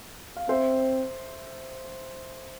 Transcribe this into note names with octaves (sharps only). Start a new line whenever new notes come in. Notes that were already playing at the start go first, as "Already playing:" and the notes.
F5
C4 C5 E5